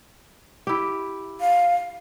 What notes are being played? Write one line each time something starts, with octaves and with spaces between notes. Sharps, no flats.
E4 G4
F5